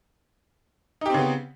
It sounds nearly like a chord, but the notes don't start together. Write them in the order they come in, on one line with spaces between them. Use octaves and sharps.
D#4 G4 C4 C#3 B3